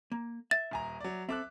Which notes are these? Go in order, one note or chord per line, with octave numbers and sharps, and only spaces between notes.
A#3
E5 A6
D#1 G#5 A#5
F#3 D5
C4 A4 E5 D6 F#6